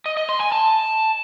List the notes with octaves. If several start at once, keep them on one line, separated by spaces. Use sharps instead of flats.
D#5
D#5
C6
G#5
A5